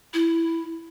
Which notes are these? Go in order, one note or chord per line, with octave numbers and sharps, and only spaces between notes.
E4